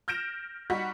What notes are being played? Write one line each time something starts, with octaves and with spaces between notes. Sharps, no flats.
F6 G6 A#6 D7 E7
G3 D#4 F#4 F#5 C#6 B6